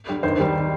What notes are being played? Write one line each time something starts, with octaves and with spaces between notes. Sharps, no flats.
D3 G3
D#2 C5
D#3 G3